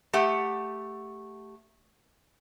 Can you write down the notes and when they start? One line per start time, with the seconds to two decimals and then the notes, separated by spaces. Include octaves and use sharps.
0.13 A3 G4 F#5